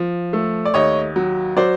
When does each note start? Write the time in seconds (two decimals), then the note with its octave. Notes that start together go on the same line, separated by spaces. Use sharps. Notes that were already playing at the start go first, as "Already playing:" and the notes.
Already playing: F3
0.33 A3
0.65 D5
0.74 D#2 C#5 D#5
1.16 F#3
1.56 F#3 C5 D5